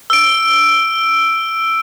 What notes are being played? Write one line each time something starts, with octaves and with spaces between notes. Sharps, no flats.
E6 D7